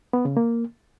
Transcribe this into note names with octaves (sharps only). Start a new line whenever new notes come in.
B3
C#3
A#3